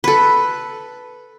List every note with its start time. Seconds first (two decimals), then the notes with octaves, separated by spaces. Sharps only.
0.04 A4 B4